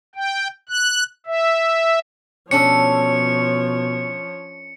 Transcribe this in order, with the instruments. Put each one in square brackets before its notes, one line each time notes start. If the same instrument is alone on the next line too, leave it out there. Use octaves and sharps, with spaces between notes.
[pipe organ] G5
F#6
E5
[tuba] B2 [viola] F3 C#5 [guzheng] C#4 D4 A4 [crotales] C#7